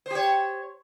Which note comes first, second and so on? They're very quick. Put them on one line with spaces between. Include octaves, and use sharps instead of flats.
C5 G4 C#5